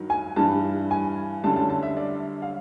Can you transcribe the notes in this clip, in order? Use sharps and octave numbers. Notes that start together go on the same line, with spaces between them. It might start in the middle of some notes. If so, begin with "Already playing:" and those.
Already playing: G2 D#3 F#3
G#5
G2 E3 G3 A5
G#5
F#2 D3 G3 A5
A5
A5
E5
D5
F5